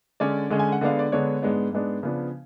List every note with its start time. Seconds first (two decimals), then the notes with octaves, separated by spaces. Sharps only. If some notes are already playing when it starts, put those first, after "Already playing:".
0.20 D3 G#3 C#4 D5
0.50 D3 G#3 C#4
0.59 G#5
0.72 F#5
0.81 D3 G#3 B3 D4 F5
0.99 D5
1.12 D3 G#3 B3 D4 C#5
1.42 G#2 G#3 B3 D4
1.72 G#2 G#3 B3 D4
2.03 C#3 F3 B3 D4